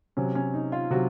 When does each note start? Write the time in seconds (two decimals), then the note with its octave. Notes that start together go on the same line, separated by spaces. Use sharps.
0.17 C3 F#3 C#4
0.35 C#4
0.54 D#4
0.72 F4
0.91 C3 F#3 F#4